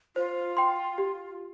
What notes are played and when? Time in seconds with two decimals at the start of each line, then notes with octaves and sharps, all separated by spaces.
0.16 F4 C5
0.57 G5 C6
0.98 G4